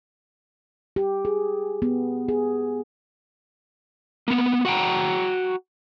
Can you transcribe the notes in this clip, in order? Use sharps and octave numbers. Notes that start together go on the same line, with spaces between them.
G4
G#4
B3
G#4
A#3 B3
F#4 F#5 G5 A#5